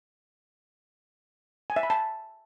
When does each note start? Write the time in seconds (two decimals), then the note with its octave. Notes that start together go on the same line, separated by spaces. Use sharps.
1.70 G#5
1.76 E5
1.83 B5
1.90 A5